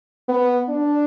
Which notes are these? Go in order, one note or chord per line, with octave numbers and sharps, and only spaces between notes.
B3
D4